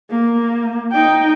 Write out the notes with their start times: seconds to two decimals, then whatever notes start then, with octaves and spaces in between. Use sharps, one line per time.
0.10 A#3
0.92 D#4 G5